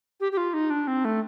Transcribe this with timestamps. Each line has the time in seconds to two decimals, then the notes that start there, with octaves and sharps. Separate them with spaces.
0.20 G4
0.32 G4
0.37 F4
0.54 D#4
0.70 D4
0.87 C4
1.05 A3